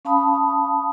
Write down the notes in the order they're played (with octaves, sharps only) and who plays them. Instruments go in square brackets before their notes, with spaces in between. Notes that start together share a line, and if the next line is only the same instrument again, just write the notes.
[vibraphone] C#4 F5 A5 B5 D#6